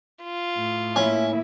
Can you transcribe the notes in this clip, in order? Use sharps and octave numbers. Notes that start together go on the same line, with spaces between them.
F4
A2
A#3 C#4 E4 E5